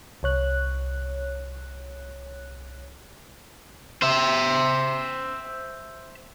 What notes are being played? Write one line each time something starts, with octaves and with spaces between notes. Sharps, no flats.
C2 C#5 F#6
C5 E5